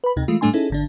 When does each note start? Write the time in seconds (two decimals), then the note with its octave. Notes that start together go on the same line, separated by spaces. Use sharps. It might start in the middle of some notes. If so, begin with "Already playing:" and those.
0.04 B4 B5
0.16 D2 C3 D#4
0.28 E3 G#3 A3 F4
0.41 A2 G3 A3 D4 G#5 C6
0.53 C#4 D#4 E4 G#4 A4
0.70 G#1 D3 D4